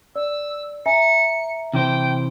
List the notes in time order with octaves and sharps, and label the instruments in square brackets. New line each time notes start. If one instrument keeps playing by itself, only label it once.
[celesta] D5 [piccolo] E6
[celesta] E5 G#5 A#5 [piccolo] C#7
[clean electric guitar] C3 E3 C5 [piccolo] G5